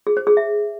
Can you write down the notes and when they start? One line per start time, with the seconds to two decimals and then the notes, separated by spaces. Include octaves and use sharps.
0.07 G#4
0.17 C5
0.27 G#4
0.37 E5